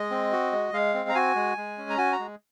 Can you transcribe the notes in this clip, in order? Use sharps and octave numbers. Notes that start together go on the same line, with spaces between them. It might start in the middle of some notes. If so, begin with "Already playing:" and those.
Already playing: G#3 D#5
C4
F#4
G#3
G#3 F5
C4
A#5
F#4 G#5
G#3
G#3
C#4
A#5
F#4 G#5
A#5
G#3